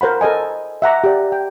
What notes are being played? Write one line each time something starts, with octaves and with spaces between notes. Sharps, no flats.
A#4 C5 F#5 B5
A4 A#4 D#5 G#5
E5 F#5 A#5 D6
G4 D5
G5